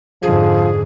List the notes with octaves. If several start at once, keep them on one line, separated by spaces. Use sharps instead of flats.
F2 G#2 D3 F3 G#4